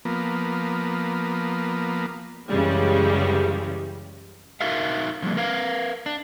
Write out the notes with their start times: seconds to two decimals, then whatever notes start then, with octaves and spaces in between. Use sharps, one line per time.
0.05 F3 A#3 B3
2.48 F#2 C#3 E3 G3 G#3
4.61 D#4 F#4 A#4 E5 F5
5.22 D3 F3 G3 A#3
5.37 A#4 B4 F5
6.06 D4